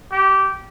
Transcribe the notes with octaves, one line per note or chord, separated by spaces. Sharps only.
G4